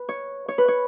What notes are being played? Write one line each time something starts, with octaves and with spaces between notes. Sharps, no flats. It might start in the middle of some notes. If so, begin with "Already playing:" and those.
Already playing: B4
C#5
C#5
B4
C#5